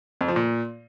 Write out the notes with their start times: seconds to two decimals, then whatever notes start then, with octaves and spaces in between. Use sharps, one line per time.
0.21 F2
0.28 F3
0.36 A#2